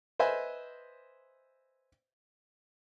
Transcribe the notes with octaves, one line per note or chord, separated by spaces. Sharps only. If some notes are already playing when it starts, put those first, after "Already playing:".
B4 C5 D#5 E5 G#5